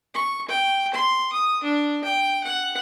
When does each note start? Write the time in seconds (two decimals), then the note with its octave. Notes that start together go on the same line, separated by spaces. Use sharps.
0.14 C#6
0.48 G5
0.93 C6
1.33 D#6
1.63 D4
2.04 G5
2.44 F#5